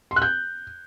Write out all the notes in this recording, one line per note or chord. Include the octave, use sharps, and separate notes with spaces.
C6
F#6
G6